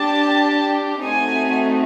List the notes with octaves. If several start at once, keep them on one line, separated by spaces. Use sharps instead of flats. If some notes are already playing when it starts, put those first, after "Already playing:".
Already playing: D4 G4 A5
A3 C4 D#4 F#4 G#5